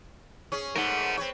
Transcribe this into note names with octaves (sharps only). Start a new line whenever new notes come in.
C#4 G#4 C#5
G#2 A3 A#4 F#5
C4 B4 C#5